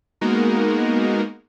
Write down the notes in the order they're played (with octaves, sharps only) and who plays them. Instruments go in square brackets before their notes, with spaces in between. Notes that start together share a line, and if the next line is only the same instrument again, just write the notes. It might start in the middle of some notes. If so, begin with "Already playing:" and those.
[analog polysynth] G#3 A#3 B3 D#4 F#4 A#4